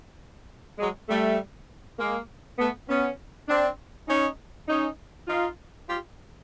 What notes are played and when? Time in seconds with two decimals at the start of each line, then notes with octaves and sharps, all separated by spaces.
0.79 F#3 G#3
1.09 G3 A3
1.99 G#3 A#3
2.59 A3 B3
2.89 B3 C#4
3.48 C4 D4
4.08 C#4 D#4
4.68 C#4 D#4
5.28 D#4 F4
5.87 F4 G4